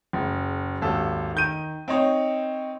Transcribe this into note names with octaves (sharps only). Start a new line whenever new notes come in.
F#1
G#1 D#2 A4
D#3 G6 D#7
C4 D#4 C#5